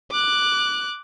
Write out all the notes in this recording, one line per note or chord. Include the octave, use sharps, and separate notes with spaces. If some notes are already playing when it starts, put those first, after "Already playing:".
D6 F#6